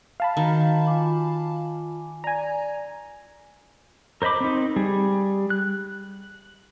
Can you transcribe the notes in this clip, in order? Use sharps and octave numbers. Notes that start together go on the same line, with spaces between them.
F5 A5 B5
D#3 F#4 A#5
F4 G#5 D6
D5 G#5 A#5
A#4 C5 D#5 B5 D6
C4 D#4
G3 G#4
F#6